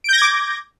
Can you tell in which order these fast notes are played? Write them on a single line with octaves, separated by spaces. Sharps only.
D7 G6 A#6 G#6 D6